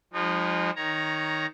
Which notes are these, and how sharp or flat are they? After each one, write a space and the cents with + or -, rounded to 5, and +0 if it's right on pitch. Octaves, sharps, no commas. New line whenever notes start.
F3 +20 G#3 -30 D#4 -30
D#3 +0 C#5 +0 A#5 +10